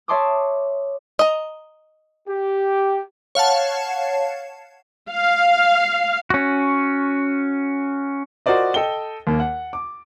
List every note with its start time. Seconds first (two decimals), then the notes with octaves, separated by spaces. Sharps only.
0.08 C#5 E5 A5 C6 D6 D#6
1.19 D#5 A#5
2.27 G4
3.35 C#5 F5 F#5 A5
5.10 F5
6.30 C#4 F#4
8.46 F4 F#4 A#4 C5 D5 D#5
8.74 A4 D#5 G5 G7
9.27 D#2 A#3
9.40 F#5
9.73 D6